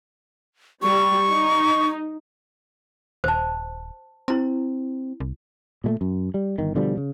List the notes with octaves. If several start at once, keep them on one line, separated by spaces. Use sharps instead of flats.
G3 C#6
D#4
D#1 C5 A5
C4 E4 A#5
C2
A#2 G#3 A3
F#2
G3
G1 D#3
B2 D3 F3 G3
C#3